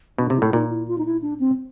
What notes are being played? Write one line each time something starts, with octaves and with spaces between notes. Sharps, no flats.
B2 D4
C3
E4
A2
E4
A#2 D#4
E4
F4
D#4
E4
D4
C4